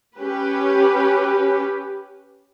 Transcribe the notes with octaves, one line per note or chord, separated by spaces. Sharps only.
C#4 G4 B4